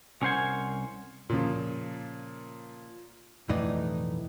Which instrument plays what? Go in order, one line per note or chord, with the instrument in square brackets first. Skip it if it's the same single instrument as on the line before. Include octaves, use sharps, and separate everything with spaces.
[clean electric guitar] C2 C#4 A#4 C5 F#5 G#5
[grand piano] A#2 C#3 F3
[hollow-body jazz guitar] B1 F2 A2 E3 D#4 D5